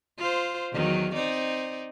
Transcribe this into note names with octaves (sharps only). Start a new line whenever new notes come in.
F4 C5
E2 D#3 F#3
C4 D#4 D5